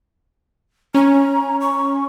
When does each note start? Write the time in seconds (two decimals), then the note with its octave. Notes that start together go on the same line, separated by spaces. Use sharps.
0.94 C#4 A#5
1.61 C#6